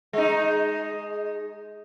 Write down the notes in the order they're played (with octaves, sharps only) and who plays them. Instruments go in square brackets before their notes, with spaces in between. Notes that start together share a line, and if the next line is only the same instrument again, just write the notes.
[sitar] G#3 D#4